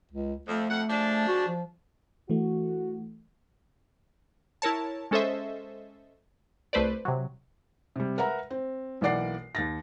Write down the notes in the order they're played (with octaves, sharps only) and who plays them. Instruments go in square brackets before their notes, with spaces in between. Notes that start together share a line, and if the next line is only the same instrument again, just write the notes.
[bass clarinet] C#2
[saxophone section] F2 [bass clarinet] A3
[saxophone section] F2 F#5
F3 G#3 D4
[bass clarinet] F#4
F3
[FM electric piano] E3 A3 [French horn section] F#4
[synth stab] E4 A#4 C#5 A5
G#3 C#4 A4 C5 D#5 E5
C2 A3 B4 C5 D5
C3 F#3
[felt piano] C3 G3
A#4 B4 E5 F#5 A#5
C4
B1 E3 A#3 D5 F#5 C7
D#2 A6 A#6